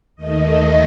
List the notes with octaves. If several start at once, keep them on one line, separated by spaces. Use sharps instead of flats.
D#2 D#3 A3 D#5